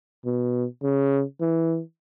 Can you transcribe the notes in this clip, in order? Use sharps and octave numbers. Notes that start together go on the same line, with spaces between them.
B2
C#3
E3